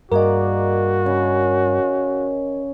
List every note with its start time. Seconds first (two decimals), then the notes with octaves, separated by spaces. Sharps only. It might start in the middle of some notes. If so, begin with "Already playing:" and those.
0.12 G2 A#3 F#4 G#4 A#4 D5 D#5
1.06 C#3 C#4 B5